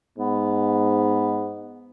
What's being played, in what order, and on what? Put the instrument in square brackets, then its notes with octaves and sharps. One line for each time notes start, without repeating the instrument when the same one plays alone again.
[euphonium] G#2 [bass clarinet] B3